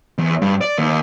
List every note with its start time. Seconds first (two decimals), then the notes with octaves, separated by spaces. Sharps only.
0.18 E2
0.42 G2
0.61 D5
0.78 D#2